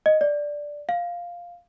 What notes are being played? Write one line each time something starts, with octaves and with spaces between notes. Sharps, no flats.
D#5
D5
F5